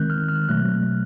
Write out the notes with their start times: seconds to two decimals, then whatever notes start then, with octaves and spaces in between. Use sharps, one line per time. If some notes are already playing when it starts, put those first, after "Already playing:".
Already playing: D#3 G#3 C4 F#6 G6
0.10 F6
0.29 F6
0.49 B2 F#3 A3 F#6